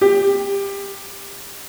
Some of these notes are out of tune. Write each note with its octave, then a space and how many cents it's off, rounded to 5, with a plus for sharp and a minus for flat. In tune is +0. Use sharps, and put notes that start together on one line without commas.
G4 +20